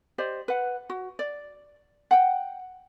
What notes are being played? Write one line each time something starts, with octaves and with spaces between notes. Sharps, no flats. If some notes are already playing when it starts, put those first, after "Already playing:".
G4 C5 D5 D#5
B4 F#5
F#4
D5
F#5 G5